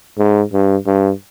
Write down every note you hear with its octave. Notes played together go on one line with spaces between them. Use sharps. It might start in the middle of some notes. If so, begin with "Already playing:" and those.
G#2
G2
G2